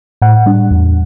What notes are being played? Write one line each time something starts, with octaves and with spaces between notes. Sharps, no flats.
A2 F#5
G3 D4
E2